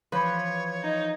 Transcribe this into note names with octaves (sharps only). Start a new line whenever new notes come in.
E3 F3 B4 C#5
D#4